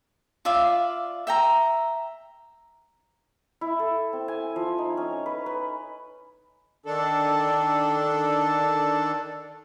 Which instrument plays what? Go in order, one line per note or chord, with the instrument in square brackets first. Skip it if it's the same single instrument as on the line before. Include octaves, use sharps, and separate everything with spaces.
[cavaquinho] F4 D5 E5 F5
E5 G5 A#5
[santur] E4
A4
C4
G#5
F3
D#4
C#4
B4
B4
[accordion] D#3 D4 A4